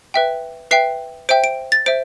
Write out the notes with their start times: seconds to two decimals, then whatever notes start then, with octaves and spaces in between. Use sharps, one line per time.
0.14 B4 E5 G5
0.71 B4 E5 G5 C7
1.29 C5 E5 G5 D7
1.44 D7
1.72 A6
1.86 C5 E5 D7